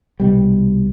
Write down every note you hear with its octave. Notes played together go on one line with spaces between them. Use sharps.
C2 B2 G3